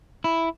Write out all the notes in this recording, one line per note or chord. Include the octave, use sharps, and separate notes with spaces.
E4